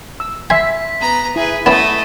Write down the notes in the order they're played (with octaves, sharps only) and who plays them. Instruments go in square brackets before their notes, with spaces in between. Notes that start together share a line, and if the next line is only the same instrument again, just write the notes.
[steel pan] E6
[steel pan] E5 C6 [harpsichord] G#5 [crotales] B6
[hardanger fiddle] B3 A#5
[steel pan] E4 [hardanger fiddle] G#4 B4
[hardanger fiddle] A3 D#5 [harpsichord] B3 C#4 [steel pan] E4 [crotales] A6 E7